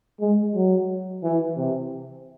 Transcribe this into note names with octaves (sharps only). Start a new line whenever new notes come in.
G#3
F#3
E3
C3